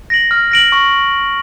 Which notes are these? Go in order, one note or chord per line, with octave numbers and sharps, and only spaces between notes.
A#6 D7 F#7
F6
A#6 D7 F#7
C#6